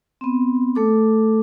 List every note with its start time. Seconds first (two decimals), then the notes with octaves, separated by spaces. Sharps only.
0.21 B3 C4
0.75 A3 A4 D6